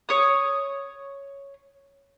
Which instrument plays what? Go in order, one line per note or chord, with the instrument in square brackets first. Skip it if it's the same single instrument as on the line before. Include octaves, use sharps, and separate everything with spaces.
[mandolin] C#5 D#6